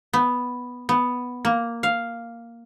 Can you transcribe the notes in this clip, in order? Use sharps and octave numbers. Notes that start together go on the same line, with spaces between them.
B3
B3
A#3
F5